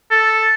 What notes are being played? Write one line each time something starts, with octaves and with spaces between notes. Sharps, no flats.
A4